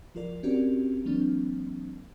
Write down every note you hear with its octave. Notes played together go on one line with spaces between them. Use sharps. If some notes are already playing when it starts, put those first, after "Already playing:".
F3 F4 A#4 D5
C4 C#4 F#4 G4 A#4 D5
E3 F#3 A#3 C4 D4